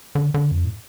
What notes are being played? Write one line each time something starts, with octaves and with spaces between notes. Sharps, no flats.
D3
D3
F2
A2